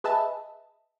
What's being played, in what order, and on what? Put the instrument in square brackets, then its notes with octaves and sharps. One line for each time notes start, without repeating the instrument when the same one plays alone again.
[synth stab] G#4 B4 D#5 E5 A5